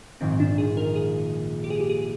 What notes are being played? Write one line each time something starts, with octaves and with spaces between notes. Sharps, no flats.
A#1 G#2 D#3 A#3 C4
D4
G#4
A#4
G#4
G4
G#4
G4
G#4